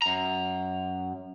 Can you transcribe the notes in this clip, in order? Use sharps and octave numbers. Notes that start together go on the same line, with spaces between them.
F#2 A#5